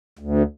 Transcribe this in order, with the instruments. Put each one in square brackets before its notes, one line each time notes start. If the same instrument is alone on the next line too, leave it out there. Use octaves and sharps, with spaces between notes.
[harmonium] D2